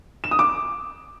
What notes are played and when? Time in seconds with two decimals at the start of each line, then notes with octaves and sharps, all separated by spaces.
0.24 E7
0.31 D#6
0.39 D6